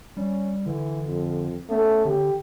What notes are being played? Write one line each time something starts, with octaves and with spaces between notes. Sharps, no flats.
G3 C#4
D3 E3
F2
A3 B3 C#4
D3 G4